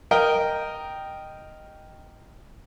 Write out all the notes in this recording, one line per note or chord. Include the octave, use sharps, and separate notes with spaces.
A#4 D#5 G5